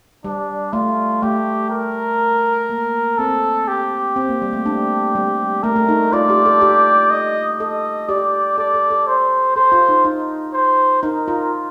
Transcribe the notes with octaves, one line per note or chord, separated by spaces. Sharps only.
G3 D4
A3 F4
A3 G4
A#4
A#3
C4 A4
G4
C4
A#3
G3
A3
D4
G3
A3 A#4
A3
D#4
F4 D5
G4
A4
G4
D#5
A4 D#5
G4 D5
A4 D5
A4
A4
C5
A4 C5
F4
D#4
D#4
C5
D#4 A#4
F4